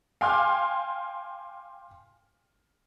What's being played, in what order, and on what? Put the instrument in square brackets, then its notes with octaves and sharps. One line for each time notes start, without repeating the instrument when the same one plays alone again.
[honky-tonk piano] F5 G5 G#5 C6 D6 F6